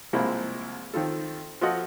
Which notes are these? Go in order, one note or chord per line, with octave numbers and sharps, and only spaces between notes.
C2 F3 G#3 A#3 C4 E4
D#3 C4 F4 A4
F3 F4 F#4 A4 D#5 F#5